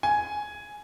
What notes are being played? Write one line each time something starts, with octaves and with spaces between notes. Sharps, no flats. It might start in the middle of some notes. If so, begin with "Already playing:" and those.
G#5